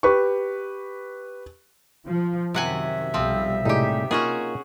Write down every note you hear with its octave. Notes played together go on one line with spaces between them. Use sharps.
G4 B4 C#6
F3
F#2 C3 D#3 E5 F#5 G#5
B1 F3 G3 C4
A2 C3 G3 G#3 D#4 G4
A#3 C#4 D#4 F4 F#4 G#4